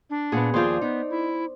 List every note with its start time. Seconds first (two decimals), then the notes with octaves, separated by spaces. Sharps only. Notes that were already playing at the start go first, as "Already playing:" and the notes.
0.10 D4
0.32 A#2 B3 G#4 F#5
0.54 D#2 F3 F4 G#4 C5 D5 G6
0.81 B3 D#4
1.10 E4